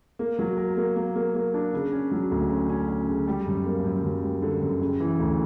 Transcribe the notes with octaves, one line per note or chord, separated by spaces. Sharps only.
A#3
F#3
A#4
A#3
A#3
A#3
A#3
D4
C#3
C#4
F#3
D2
C#4
C#4
C#4
C#3
G3
F#2
A#3
F#2
F#2
G3
D3
F#2
C#3
E3
D2